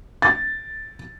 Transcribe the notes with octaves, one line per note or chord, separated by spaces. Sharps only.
A6